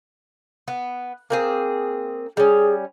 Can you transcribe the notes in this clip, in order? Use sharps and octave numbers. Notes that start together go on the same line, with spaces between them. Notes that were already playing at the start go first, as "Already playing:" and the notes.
B3
A#3 C4 G#4
G3 C#4 G#4